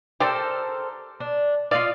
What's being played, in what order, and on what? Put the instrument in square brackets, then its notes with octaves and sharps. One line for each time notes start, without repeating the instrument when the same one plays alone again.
[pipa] G4 D5 [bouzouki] A4 A#4 C5
[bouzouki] D4
[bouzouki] F4 D#5 F5 [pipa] D5